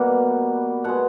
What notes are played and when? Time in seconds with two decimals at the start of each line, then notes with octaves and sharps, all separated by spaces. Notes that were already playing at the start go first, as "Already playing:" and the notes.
Already playing: B2 G3 A#3 F#5
0.84 B2 G#3 F#5